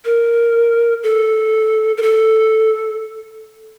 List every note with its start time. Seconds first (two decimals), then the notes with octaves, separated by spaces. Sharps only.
0.05 A#4
1.03 A4
1.97 A#4
2.02 A4